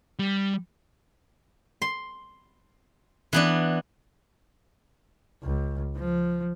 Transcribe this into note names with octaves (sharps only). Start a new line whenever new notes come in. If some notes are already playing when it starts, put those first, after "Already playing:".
G3
C6
E3 B3 D4
C#2
F3